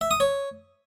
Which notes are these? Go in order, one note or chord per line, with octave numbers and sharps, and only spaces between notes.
E5
D#6
C#5